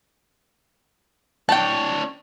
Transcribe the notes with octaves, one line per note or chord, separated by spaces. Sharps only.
D4 C#5 G5 A5